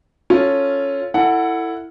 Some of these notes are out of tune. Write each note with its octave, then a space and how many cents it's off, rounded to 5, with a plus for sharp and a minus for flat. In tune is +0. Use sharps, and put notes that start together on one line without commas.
C#4 +0 F4 +0 A4 +0
E4 +5 A4 +25 F#5 +0